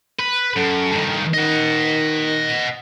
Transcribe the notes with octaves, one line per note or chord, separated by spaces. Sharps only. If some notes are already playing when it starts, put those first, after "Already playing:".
B4
F#2 A4
G2 D#3
D#3 D#5 F#5